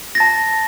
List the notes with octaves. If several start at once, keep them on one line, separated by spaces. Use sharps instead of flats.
A5 A6 A#6